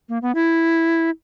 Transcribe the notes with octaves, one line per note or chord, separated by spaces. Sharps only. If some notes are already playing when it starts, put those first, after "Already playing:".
A#3
B3
E4